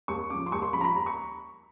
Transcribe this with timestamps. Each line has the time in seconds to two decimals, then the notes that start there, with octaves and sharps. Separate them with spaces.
0.08 D#2 C#6
0.30 C#3 F3 D6
0.46 C6
0.52 D#2 C#6
0.62 C6
0.73 C#3 F3 B5
0.81 A#5
0.84 B5
0.95 D#2 A#5
1.06 C#6